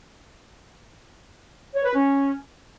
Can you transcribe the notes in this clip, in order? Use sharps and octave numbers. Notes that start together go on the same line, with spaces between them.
C#5
B4
C#4